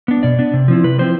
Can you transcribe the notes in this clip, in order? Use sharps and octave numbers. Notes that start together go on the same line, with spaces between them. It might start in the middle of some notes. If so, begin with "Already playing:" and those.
B3 D4
B2 D5
B3 D4
C3
F3 C4 E4
C3 B4
F3 C4 E4 C5